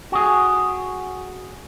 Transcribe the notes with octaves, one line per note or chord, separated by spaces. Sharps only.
F#4 G#4